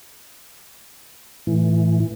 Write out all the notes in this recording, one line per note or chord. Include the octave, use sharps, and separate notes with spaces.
A2 E3